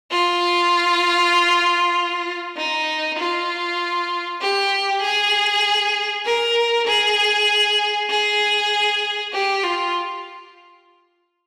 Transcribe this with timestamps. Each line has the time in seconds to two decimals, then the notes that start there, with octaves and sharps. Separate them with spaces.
0.11 F4
2.56 D#4
3.18 F4
4.41 G4
5.02 G#4
6.25 A#4
6.87 G#4
8.10 G#4
9.33 G4
9.63 F4